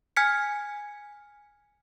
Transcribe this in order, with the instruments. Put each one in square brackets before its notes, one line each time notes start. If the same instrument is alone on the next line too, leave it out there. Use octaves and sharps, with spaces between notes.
[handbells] G#5 F6 G#6 B6 C#7